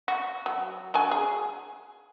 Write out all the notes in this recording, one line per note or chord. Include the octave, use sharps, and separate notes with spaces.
F#4
F#3
F#3 D4 G#5
G#4